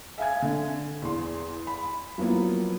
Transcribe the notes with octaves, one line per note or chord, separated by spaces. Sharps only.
E5 F5 G#5 G#6
D3
E2 C6
B5
F3 F#3 A#3 B3 E4